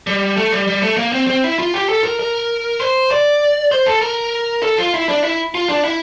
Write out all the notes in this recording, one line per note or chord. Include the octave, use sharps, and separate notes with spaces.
G3
A3
G3
G3
A3
A#3
C4
C4
E4
F4
G4
A4
A#4
A#4
C5
D5
C5
A4
A#4
A4
F4
E4
D4
E4
F4
D4
E4